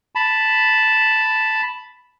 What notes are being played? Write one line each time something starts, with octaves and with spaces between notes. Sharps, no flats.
A5 B5